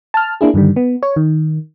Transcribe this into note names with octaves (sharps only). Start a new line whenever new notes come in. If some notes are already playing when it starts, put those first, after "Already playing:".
A5 F6
A#3 D4 E4 G#4
G2 D3 D#3 G3
B3
C#5
D#3